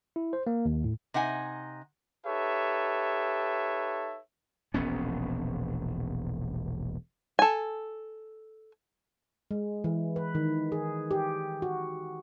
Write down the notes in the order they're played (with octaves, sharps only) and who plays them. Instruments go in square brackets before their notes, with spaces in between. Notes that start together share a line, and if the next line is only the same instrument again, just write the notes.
[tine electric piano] E4
C5
A#3
D#2
A2
[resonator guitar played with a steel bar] C3 D#4 F#5 G#5
[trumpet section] D#4 G4 A4 B4 C#5 E5
[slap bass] E1 A#1 B3 C#4
[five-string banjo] A4 G#5
[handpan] G#3
E3
B4
D#3
G#4
G4
F#4